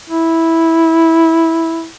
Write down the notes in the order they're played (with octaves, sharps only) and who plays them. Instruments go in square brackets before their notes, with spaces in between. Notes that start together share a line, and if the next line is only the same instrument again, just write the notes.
[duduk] E4